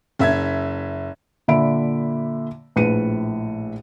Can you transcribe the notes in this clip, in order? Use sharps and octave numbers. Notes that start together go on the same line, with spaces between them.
F#1 E5 G#6
A#2 D3 E5 B5 D7
A#1 A2 B4 C#7 D#7